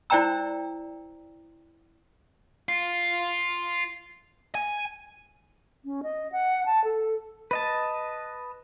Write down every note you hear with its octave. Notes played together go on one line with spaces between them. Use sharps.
E4 C5 D5 G5 A#5 E6
F4
G#5
C#4
D#5
F#5
A5
A4
B4 D#5 A5